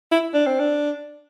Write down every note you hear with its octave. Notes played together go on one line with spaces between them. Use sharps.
E4
D4
C4
D4